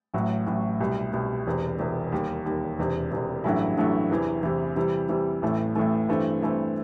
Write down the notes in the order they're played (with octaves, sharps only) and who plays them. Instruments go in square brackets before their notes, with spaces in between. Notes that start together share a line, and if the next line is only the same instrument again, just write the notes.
[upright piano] A1 A2 F#3
A1 A2 F#3
C2 B2 G3
C2 B2 G3
E1 E2 C3
E1 E2 C3
D#2 D#3 G3
D#2 D#3 G3
E1 E2 C3
E1 E2 C3
A1 G2 F#3 A3 E4
A1 G2 F#3 A3 E4
E2 C3 E3
E2 C3 E3
C3 E3 G3
C3 E3 G3
A1 A2 E3 A3
A1 A2 E3 A3
G2 E3 A3 C4
G2 E3 A3 C4